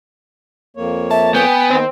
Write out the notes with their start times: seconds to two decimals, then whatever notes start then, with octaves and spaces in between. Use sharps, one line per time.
0.77 F2 A#3 C#5
1.11 E5 A5
1.34 B3 G5 G#5
1.70 D#3 C4